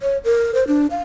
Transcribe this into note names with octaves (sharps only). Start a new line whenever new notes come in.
C#5
A#4
C5
D4
F5